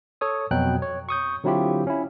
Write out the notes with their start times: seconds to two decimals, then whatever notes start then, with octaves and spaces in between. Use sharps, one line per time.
0.21 A4 C#5 D#6
0.51 F2 B2 F#3 G5 F#6
0.82 C#5
1.09 C#6 D#6 G6
1.44 D3 F#3 C4 E4 F4 G4
1.87 C#4 E4